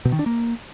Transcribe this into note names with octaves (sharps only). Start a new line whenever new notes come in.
B2
D#3
D4
A#3